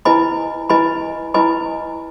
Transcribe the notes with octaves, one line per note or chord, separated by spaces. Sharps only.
E4 B4 D#5 G#5 B5
E4 B4 D#5 G#5 B5
E4 B4 D#5 G#5 B5